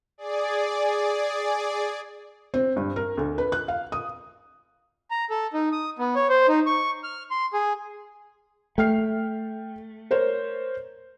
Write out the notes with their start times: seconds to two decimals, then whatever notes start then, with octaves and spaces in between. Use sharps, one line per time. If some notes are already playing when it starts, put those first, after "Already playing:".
0.18 G#4 D5
2.54 C4
2.76 G2
2.96 A#4
3.17 D2
3.38 B4
3.52 F#6
3.68 F5
3.92 D#6
5.11 A#5
5.30 A4
5.54 D#4
5.72 D#6
5.99 B3
6.15 C#5
6.29 C5
6.48 D#4
6.66 C#6
7.04 F6
7.31 C6
7.53 G#4
8.78 A3 G5 F6 C7
10.11 A#4 C5 C#5